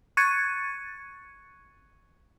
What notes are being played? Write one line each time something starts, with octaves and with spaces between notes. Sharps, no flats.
C#6 F#6 G#6 A6 C#7 D#7